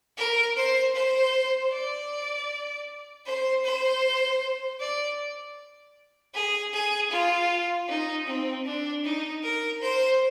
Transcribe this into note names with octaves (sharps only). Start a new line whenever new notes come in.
A#4
C5
C5
D5
C5
C5
D5
G#4
G#4
F4
D#4
C4
D4
D#4
A#4
C5